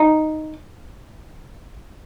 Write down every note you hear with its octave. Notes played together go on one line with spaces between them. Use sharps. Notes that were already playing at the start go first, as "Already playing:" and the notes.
Already playing: D#4